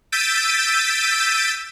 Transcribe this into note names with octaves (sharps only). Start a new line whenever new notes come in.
E6 G6 A6 B6 D7 D#7